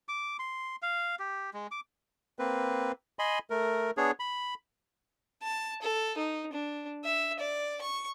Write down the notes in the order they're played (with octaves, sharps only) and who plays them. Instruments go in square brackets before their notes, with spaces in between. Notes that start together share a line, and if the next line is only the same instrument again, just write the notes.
[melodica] D6
C6
F5
G4
G#3
D6
[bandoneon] A#3 C4 B4
D#5 G#5 B5 C6
A3 A#4
B3 D4 G#4 C#5
B5
[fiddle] A5
A4
D#4
D4
E5
D5
C#6